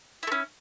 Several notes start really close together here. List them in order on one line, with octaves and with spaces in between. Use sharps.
E4 A3 C#4